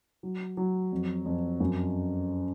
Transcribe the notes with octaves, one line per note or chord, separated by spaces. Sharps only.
F#3
F#3
F2
F2
F#2